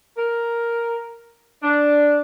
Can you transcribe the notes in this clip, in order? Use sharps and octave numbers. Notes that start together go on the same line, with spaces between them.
A#4
D4